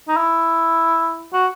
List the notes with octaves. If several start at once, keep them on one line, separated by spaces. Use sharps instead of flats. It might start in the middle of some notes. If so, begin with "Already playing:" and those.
D#4
E4
F#4